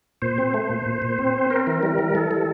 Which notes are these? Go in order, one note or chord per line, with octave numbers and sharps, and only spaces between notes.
A#2 C5
C4
A3
A#2
A#2
A#2
C4
C4
C4 A#4
E3
G3
E3
E3 A4
G3